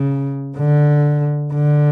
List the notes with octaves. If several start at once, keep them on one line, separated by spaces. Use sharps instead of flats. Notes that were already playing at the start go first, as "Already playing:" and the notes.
Already playing: C#3
D3
D3